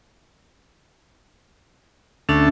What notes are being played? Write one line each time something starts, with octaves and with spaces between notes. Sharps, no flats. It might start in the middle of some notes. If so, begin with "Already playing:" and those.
D2 C#4 D4 A4 E5